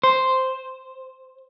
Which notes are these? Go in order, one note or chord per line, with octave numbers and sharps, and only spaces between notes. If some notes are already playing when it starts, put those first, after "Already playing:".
C5